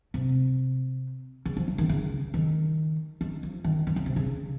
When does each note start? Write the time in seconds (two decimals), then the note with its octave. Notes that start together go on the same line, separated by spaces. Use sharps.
0.14 C3
1.45 C#3
1.57 F3
1.68 D#3
1.78 D#3
1.89 C#3
2.34 D#3
3.21 D#3
3.43 F3
3.64 D#3
3.87 D#3
3.96 C#3
4.06 C3
4.16 C#3